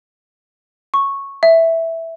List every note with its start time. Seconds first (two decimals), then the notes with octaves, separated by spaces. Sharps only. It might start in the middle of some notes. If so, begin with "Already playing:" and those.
0.94 C#6
1.43 E5